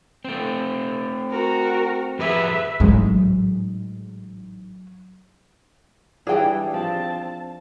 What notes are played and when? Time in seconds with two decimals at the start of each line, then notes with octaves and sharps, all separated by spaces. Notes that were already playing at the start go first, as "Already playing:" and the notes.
0.25 A3 C4
1.30 F#4 A#4
2.19 F2 G4 G#4 B4 E5
2.80 A1 G#2 F#3
6.27 E3 G3 D4 G#4 G5
6.74 F3 C4 A5